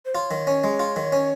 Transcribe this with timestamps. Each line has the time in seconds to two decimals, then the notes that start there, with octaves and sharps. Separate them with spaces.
0.05 C5
0.14 F4 C#5
0.31 D#3
0.47 C#4
0.64 G#3
0.79 F4
0.96 D#3
1.12 C#4